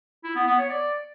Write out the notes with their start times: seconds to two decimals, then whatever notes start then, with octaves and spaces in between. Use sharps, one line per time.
0.24 E4
0.36 B3
0.47 B3
0.58 C#5
0.70 D5